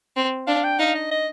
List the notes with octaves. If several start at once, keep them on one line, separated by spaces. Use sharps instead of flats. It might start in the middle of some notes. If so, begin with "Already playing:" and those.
C4
D4 F5
G5
D#4 F5
D#5
D#5